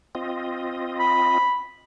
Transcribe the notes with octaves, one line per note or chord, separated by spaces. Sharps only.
C4 F4 D#5
B5